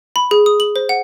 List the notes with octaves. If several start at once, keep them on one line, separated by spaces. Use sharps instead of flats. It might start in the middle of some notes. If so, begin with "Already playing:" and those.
B5
G#4
D#6
F#7
C5
F#5